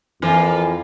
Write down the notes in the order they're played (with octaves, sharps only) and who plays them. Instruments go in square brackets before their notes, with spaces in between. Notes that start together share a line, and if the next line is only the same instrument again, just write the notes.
[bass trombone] F2 [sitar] E3 A#3 F4